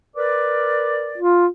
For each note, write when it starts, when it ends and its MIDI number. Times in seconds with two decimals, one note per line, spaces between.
0.16 1.18 70
0.16 1.18 71
0.16 1.18 74
1.18 1.47 65